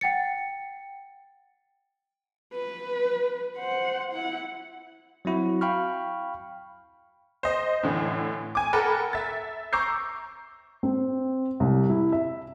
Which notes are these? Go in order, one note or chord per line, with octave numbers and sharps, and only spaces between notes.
F#5 G5 A6 C#7
B4
C5 F#5
E4 F#5
F#3 C4 E4 F#4
F5 G5 B5 C#6 F6
C5 D#5
A2 D3 E3
G#5 D6
A4 A#4 F#5 G5 B5
E5 A6
A#5 C#6 D6 E6 G6 C7
C4
C2
E4
E5